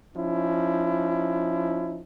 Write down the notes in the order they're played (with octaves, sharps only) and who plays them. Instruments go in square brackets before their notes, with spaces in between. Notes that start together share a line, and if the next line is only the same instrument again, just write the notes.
[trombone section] F3 C#4 D#4 E4